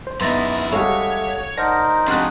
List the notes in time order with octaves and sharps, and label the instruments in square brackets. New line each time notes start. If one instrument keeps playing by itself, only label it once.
[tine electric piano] C5
[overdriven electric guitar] F#2 E4 [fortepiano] B3 D#4 [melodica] E5 [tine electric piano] C6 A6 A#6
[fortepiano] G3 G#3 [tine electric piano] A4 F5 F#5 [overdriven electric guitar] C#5
[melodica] D#4 A#4 C5 [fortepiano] D5 F#5 A5 [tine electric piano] A#6
[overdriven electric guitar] F2 [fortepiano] G#3 D4 [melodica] D#4 F#4 [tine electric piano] C6 F#6